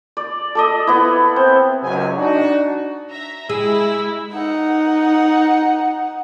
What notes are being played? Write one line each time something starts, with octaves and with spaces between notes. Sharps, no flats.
D5
A4 D5 D#5
B3 E4
C4
C#2 F#2 G#5
D4 D#4 F#4
E5 A#5
G#3 E4 G#4 E6
D#4 F#5